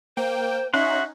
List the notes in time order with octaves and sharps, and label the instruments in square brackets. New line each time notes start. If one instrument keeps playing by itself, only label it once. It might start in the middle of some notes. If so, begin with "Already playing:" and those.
[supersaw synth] A#3 G5 [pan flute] C5
[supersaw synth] C#4 D#4 [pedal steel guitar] F#4 F#5 C6 [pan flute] E5